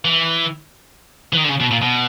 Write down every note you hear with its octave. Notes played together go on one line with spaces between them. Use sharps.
E3
E3
D#3
D3
C#3
B2
A#2
B2